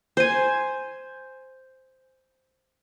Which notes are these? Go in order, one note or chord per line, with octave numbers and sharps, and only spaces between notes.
C5 G#5